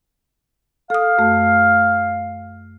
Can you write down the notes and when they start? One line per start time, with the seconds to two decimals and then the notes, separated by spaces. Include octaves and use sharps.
0.90 A4 F5 D#6
1.18 F#2 A3